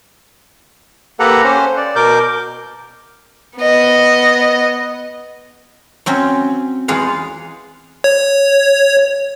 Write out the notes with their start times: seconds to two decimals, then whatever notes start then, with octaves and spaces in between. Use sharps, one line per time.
1.20 A#3 G4 A4 B4 F#5 A#5
1.44 C#4 C5
1.77 D5
1.96 B2 A#4 D6 G6
3.58 B3 D#5
6.06 F#3 C4 C#4
6.88 E2 G#3 F4 F5 F#5
8.04 C#5